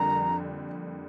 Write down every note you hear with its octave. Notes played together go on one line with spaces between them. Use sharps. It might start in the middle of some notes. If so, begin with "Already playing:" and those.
Already playing: F2 D3 G3 A#3 A#5